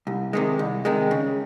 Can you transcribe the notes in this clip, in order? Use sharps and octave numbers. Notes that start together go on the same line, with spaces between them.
C2
C3 D#3 G#3
C2
C3 D#3 G#3
C#3